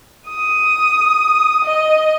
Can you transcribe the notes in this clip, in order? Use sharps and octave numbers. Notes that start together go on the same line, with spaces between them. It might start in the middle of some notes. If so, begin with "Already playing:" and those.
D#6
D#5